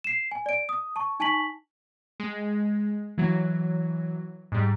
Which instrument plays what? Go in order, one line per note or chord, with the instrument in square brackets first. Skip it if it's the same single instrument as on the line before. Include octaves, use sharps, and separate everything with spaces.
[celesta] C7 E7
G#5
D5 D7
D#6
A5 C#6
D#4 G#5 A5 C#6 B6 F#7
[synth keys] G#3
E3 F#3
G#2 G3